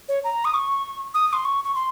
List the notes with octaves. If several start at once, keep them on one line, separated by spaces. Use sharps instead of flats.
C#5
A#5
D#6
C#6
D#6
C6
C#6
C#6
C6